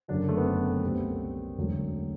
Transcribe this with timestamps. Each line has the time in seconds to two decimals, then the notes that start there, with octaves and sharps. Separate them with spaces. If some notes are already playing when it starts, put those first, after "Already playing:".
0.08 F#1 F#2 D3 F#3 D4
0.28 A3
0.37 B3
0.46 C4
0.83 C2 B2 G3
1.57 E1 D2 D3 F#3